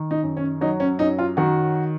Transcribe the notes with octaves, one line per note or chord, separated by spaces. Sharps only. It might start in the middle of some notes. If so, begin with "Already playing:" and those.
Already playing: D#3
D#4
F#2
C#4
F#3 D#4
C#4
F#2 D#4
F4
D#3 F#4